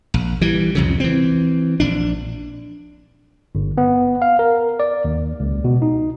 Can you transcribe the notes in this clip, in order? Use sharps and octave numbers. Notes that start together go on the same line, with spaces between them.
A#1
E3 G3
C2 F2 C#3
E3 C4
A#1 D4
G1
B3
F5
A#4
D5
D#2
C#2
B2
D#4